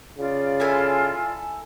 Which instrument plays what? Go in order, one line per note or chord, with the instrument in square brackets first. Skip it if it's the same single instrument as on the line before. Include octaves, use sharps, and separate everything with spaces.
[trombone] C#3 [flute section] F4 D5
[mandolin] E4 A4 G#5